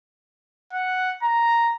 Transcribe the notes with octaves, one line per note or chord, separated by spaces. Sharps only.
F#5
A#5